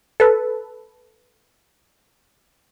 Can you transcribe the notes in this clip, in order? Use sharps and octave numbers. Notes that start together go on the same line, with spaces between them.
A4 B4